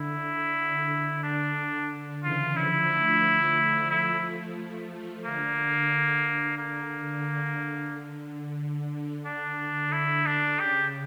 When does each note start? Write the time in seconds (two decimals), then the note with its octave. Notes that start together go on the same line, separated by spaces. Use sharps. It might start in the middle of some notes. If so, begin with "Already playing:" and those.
Already playing: D3 E4
1.23 D3 D4
1.90 D3
2.23 C#3 E3 F4
2.56 D3 F3 E4
2.90 F3 A3
3.90 E4
4.57 F3 A3
5.24 D3 A#3
6.58 A#3
7.25 D3
9.25 D3 D4
9.92 E4
10.26 D4
10.59 C#3 G4